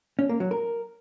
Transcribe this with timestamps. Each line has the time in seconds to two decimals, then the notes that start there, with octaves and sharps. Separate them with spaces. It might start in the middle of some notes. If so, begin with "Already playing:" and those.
0.19 C#4
0.29 A#3
0.40 F#3
0.51 A#4